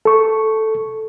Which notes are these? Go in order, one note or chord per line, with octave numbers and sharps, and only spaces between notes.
A4 C#6